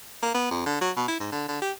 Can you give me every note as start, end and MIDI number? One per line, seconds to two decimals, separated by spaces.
0.22 0.32 58
0.34 0.51 59
0.51 0.66 41
0.66 0.77 50
0.81 0.91 54
0.97 1.06 47
1.08 1.18 64
1.20 1.29 44
1.32 1.45 50
1.48 1.61 50
1.62 1.72 67